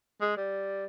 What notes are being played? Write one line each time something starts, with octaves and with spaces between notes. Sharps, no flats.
G#3
G3